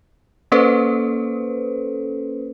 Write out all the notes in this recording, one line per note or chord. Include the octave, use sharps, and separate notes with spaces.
A#3 C#4 A4 B4 C5